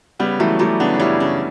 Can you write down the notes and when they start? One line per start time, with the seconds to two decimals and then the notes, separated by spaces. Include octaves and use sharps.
0.19 C#3 G3 B3
0.39 E3 F#3 A3
0.59 F#3 G3 A3
0.80 C#3 B3 D4
0.94 D4
0.99 G3 C#4 E4
1.20 C#3